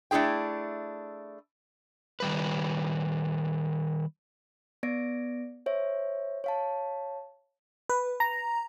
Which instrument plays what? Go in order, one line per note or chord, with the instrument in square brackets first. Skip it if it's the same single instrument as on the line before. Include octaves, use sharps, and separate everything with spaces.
[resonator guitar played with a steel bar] A3 D4 E4 G#4 G5
[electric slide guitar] D#3 G3 B4
[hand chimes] B3 D5 A#6 D7
C5 C#5 E5
C#5 F5 A5
[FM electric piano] B4
A#5